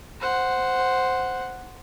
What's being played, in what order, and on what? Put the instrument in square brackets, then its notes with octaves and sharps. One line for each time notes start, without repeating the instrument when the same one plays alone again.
[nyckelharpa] C5 F#5